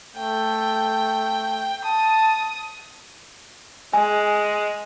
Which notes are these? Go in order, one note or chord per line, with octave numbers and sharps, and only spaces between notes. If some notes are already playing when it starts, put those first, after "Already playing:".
A3 G5
A5 D#6
G#3 G#5